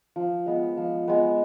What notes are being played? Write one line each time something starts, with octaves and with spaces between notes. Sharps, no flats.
F3
G#3 B3
F3
G#3 B3